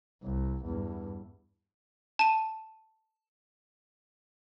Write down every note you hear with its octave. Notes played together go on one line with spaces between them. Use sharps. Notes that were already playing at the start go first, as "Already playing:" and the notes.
C2
E2 G2
A5 D#7